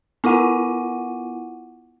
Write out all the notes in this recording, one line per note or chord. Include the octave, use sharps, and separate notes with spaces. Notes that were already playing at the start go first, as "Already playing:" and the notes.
B3 E4 F4 F#5